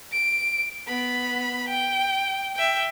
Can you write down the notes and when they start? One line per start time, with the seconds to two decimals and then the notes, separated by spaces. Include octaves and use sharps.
0.12 D7
0.87 B3 B5
1.69 G5
2.55 E5 G5